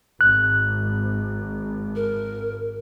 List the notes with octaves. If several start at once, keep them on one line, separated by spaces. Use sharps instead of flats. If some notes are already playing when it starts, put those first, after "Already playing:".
G#1 F#6
A#4